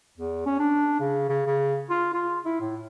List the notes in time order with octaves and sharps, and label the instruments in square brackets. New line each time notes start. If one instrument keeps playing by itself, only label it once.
[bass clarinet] E2
C#4
D4
C#3
C#3
C#3
F4
F4
E4
A2